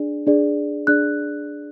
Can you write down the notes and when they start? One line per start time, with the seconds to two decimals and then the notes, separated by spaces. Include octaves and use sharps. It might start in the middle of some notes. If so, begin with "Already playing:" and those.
Already playing: D4 G#4 D5
0.27 D4 G#4 D5
0.87 D4 G#4 D5 F#6